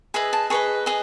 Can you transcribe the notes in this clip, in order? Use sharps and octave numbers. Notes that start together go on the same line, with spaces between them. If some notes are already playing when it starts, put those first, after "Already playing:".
G#4 B4 D#5 E5
A5
G#4 B4 D#5 C#6
G#4 B4 D#5